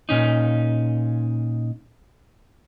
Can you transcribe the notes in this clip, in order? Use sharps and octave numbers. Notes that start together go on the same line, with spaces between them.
A#2 C#4 D#4